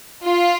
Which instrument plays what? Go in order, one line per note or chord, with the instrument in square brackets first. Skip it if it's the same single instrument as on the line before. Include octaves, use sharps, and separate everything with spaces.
[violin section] F4